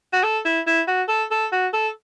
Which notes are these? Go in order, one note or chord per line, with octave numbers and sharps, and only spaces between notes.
F#4
A4
E4
E4
F#4
A4
A4
F#4
A4